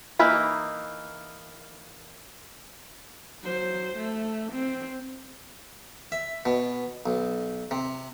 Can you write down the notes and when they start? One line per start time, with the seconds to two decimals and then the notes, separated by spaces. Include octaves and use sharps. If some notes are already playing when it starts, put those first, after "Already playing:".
0.19 E3 A#3 D#4 B5
3.43 F#3 C5
3.96 A3
4.52 C4
6.12 E5
6.46 B2
7.06 B1
7.71 C3